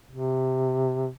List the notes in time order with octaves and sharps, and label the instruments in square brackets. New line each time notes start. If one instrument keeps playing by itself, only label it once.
[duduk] C3